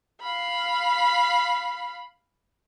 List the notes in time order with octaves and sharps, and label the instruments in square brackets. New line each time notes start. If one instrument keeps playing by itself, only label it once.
[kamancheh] F5 B5